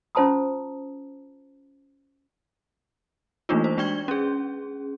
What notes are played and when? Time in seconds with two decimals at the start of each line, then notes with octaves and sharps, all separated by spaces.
0.15 C#4 F4 C5 A5 A#5 D#6
3.49 E3 A3 A#3 D4 D#4 F4
3.64 C5
3.77 G#3 D4 D5 G5 G#6 G7
4.08 C#4 G#4